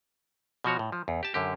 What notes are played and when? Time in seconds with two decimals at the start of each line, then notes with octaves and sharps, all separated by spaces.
0.64 B2 F3 F#4 C#5
0.79 A2
0.92 F3
1.08 E2
1.23 G4 A5
1.34 F#2 D3 G4